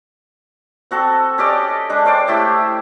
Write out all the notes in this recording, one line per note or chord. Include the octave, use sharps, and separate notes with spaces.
C4 F#4 A4 F#5
C#4 G4 D5 D#5
G#3 D4
C#4 C5 D5 G5
A3 E4 G4